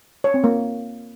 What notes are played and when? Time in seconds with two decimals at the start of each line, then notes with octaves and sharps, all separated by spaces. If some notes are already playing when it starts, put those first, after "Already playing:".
0.24 C#5
0.34 C4
0.44 A#3